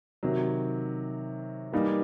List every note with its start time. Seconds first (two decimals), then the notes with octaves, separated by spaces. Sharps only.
0.23 C3 D#3 F#3
1.73 E3 G3 A#3 D#4